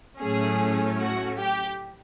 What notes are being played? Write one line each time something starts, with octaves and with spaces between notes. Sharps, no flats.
A2 F#3 A3 C#4 G#4
F#4
G4